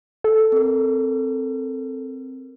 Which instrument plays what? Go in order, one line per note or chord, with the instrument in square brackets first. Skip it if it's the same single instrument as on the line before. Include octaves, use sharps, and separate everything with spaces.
[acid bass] A4
[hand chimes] C4 A#4